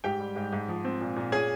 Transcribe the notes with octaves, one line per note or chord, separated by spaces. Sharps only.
G#2 G4 G5
G3
G#2
G#2
F3
C4
A#2
A#2
C#4 G#4 G#5